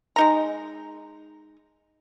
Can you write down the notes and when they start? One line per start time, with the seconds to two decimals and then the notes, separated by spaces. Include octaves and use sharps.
0.16 G#3 D#4 A#5